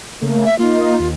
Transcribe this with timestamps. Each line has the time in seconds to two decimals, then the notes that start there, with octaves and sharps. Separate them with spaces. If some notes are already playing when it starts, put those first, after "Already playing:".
0.21 C#3 A3 A#3
0.45 E5
0.59 A#3 D#4 F4
0.99 D#2